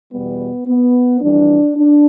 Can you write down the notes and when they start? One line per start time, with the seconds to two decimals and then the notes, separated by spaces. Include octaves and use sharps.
0.11 E2 B2 G3 B3
0.67 B3
1.21 F2 E3 G3 D4
1.75 D4